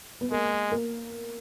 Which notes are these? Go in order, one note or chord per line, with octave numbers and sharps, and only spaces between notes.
B3
G#3 A#3
A#3